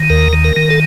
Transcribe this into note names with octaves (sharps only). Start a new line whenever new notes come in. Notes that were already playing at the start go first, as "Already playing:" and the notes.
Already playing: D#3
D#2 A#4
D#3
A#4
D#3
A4